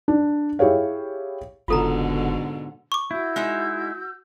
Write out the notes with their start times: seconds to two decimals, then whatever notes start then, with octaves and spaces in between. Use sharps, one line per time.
0.08 D4
0.59 E4 G4 G#4 C#5 F5
1.68 F#1 G#2 B2 D3 F4 A4 A#5
2.92 C#6 D6
3.11 E4 F#4 E6 G6
3.36 G#3 D#4 E5